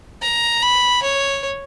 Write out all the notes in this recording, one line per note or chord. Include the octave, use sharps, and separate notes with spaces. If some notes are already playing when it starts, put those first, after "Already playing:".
A#5
B5
C#5